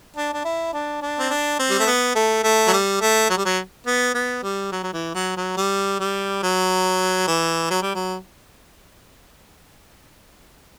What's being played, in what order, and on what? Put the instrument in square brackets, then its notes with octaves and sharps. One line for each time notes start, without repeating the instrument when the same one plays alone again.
[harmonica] D4
D4
E4
D4
D4
C4
D4
C4
G3
A3
B3
A3
A3
F#3
G3
A3
F#3
G3
F#3
B3
B3
G3
F#3
F#3
E3
F#3
F#3
G3
G3
F#3
E3
F#3
G3
F#3